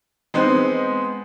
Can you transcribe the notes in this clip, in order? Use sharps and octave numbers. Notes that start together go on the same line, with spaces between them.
G#3 B3 C4 D#4